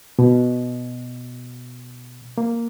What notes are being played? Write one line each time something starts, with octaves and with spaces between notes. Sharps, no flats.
B2
A#3